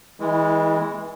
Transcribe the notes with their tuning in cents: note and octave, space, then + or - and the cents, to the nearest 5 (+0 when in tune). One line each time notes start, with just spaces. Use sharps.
E3 -30 G#3 -10 E4 +0